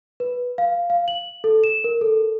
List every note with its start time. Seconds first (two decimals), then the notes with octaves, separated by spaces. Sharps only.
0.20 B4
0.58 F5
0.90 F5
1.08 F#7
1.44 A4
1.64 E7
1.84 A#4
2.01 A4